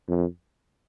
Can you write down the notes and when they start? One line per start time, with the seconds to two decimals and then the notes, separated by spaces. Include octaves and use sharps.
0.09 F2